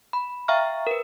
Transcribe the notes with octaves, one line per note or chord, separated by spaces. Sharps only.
B5
E5 F5 G5 A#5 C#6 F6
A#4 B4